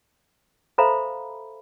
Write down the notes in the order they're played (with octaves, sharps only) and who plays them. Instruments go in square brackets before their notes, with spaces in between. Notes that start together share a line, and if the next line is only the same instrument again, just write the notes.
[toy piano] A4 C5 E5 F5 A#5 B5